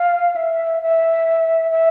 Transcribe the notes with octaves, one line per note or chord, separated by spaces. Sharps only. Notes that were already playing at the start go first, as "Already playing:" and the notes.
Already playing: F5
E5
E5
E5